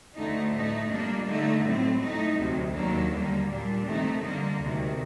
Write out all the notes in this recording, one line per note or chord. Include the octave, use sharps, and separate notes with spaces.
D2 D3 A3 D#4
A2 A3 D#4
A#2 G3 A#3 D4
D3 A3 D#4
A2 F#3 C4
A2 A3 D#4
D2 C3 F#3
D#2 D#3 F#3 A#3 D4
D#2 D3 G3 A#3
A#2 G3 D4
C3 D#3 A3 D#4
D3 G3 A#3
D2 C3 D#3